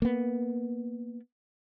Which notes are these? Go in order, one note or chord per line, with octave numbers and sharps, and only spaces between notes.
A#3 B3